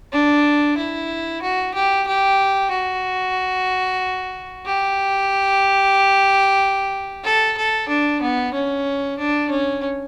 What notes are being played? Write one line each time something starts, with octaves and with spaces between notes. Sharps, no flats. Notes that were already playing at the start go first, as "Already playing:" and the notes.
D4
E4
F#4
G4
G4
F#4
G4
A4
A4
D4
B3
C#4
D4
C#4